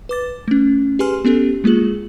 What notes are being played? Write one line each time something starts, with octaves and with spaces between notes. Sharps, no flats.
B4 D6 A6
A3 C#4
G4 G#4 B4 G#5 C6 F6
B3 C#4 G4 A4
G#3 A#3 F4 G#4 F#7